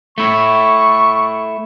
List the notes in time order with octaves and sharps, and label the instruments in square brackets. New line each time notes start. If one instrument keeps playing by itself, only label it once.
[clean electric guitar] A3 E4 [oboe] C#6